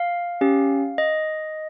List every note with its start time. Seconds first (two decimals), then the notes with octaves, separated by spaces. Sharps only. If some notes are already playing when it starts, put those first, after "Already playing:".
Already playing: F5
0.41 C#4 G4
0.98 D#5